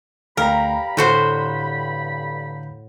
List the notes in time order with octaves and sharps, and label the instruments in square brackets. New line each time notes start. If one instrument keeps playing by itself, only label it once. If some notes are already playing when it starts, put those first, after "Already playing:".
[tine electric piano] D2 [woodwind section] G2 B5 [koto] A#4 [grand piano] F5 G5 A#5
[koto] A2 F#4 C5 [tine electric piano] D3 G6